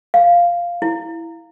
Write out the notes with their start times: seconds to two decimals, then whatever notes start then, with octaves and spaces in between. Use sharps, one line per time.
0.14 F5
0.82 E4